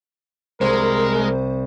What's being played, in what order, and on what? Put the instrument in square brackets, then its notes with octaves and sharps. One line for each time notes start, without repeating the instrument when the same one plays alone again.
[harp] C2 [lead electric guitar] G#3 [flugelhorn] A#4 [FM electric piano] C5